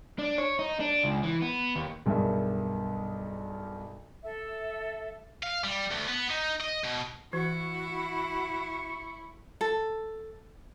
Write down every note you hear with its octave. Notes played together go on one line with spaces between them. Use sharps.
D4
C#5
D#4
D4
C#2
E3
B3
D#2
B1 G2 G#4 A#4 E5
A4 E5
F5
G3
D2
B3
D#4
D#5
B2
E3 E4 F#4 C#6
A4